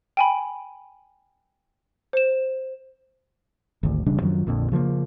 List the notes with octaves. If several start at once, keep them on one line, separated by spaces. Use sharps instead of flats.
G5 G#5 B5
C5 E7
G#1 D2
E1 C#3 G3 D4
F#2 D#3 F3 F#3
A#1 F2 A#2 D3
C#3 F3 G#3 A#3